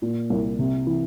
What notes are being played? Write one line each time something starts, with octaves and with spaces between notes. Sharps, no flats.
A#2
C2
C3
E3